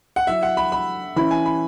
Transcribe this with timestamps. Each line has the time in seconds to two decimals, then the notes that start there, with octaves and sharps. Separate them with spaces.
0.16 F#5
0.27 F#3 E4 E5
0.43 F#5
0.57 B5
0.72 B5
1.16 E3 C#4 E4 B5
1.31 G#5
1.46 B5